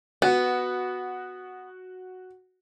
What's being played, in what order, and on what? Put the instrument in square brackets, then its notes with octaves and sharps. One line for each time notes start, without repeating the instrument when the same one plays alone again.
[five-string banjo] B3 [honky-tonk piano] F#4